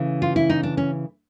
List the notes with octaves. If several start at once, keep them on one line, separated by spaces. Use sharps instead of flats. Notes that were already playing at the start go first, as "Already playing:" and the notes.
Already playing: C#3 E3 A3
F4
E4
D#4
D4
C#4